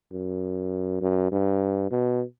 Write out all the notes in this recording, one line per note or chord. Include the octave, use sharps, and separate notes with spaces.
F#2
F#2
G2
B2